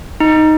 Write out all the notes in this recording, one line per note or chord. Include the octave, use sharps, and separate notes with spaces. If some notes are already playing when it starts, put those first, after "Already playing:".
D#4